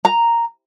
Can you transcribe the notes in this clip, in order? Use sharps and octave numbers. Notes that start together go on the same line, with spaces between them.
A#5